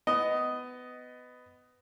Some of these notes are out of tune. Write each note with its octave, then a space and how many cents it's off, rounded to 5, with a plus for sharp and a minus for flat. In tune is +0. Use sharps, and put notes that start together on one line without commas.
B3 +20 D#5 +0